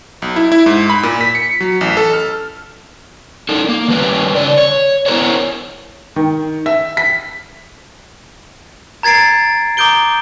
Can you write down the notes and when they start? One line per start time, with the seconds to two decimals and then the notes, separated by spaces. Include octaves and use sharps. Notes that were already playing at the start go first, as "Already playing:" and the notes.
0.22 B1
0.36 E4
0.52 E4
0.66 G#2
0.90 B5
1.03 A#2
1.21 B6
1.35 C#7
1.60 F#3
1.81 A1
1.97 A4
2.13 F6
3.49 D#4 A4 A#4
3.69 A#3
3.88 D#3 G3 C#4 B4
4.35 C#3 D5
4.57 C#5
5.06 B3 E4 G#4 A#4 C5 C#5
6.16 D#3
6.66 E5
6.97 B6
9.03 A#5 G#6 A6 C7 D7
9.77 A#5 D6 D#6 G6 D7 G7